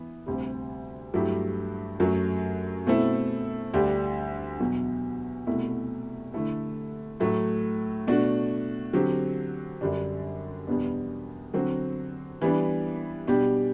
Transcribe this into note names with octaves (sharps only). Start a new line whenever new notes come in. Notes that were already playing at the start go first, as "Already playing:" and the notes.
Already playing: E3 B3
D2 C3 G3
G2 F#3 A3 E4 G4
F#2 F#3 A3
B2 A3 C4 E4 A4
D2 D3 G3 D4 G4
E2 B2 F#3
C2 B2 A3 E4
D3 A3 E4 A4
A2 F#3 A3
B2 A3 D4 F#4
D3 F#3 C4 G4
F#2 D3 G3 D4
E2 B2 G3 B3 D4
D3 F#3 C4 F#4
E3 G3 B3 D4
B2 G3 D4 G4